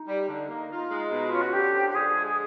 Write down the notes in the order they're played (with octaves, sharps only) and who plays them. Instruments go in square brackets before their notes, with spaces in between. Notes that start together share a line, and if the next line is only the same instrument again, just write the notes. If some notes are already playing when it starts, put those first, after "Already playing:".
Already playing: [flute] D#4
[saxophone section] G3
D3
A#3
F4
G#3
B2
[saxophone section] C#4 [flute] F4
[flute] F#4
[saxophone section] D3 [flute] G4
[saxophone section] F3
[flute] G4
[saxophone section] D3 [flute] G#4
[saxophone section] G#3
[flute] G#4